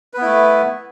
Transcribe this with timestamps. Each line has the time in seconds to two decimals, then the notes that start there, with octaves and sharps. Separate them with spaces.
0.14 B4
0.18 B3
0.21 E4
0.25 A3